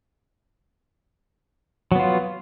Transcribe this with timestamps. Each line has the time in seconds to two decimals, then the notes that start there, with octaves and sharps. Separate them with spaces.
1.92 F#3
1.95 B3
1.99 F4